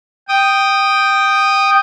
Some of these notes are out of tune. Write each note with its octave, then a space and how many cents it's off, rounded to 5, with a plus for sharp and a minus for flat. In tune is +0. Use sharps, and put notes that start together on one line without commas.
G5 +0 D#6 -10